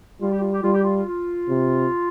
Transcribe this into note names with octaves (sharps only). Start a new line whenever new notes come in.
G3 F4
G4
F4
G4
G3 F4
G4
F4
F4
C3